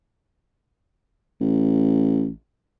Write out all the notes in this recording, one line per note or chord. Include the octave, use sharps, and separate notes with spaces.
A1